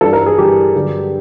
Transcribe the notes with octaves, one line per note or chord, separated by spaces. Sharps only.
G2 E3 G3 A4
A#4
G#4
G2 E3 G3 G4
G2 D3 F#3